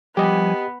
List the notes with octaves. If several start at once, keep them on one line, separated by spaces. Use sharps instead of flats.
F3 G3 B3 G4 D#5 G#5